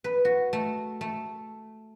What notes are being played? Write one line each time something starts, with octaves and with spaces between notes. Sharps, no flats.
B4
F#4
A3
A3